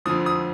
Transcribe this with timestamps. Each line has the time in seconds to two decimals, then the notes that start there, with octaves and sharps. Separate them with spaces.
0.06 F2 D3 F3 D#6
0.26 D#6